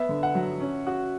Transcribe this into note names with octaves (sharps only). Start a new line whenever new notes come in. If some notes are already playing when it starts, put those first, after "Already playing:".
Already playing: B3 E5
D3
F#5
F#3
C#4
F#4